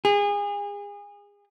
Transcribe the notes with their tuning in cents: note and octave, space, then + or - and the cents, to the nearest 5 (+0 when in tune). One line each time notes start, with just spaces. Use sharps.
G#4 -30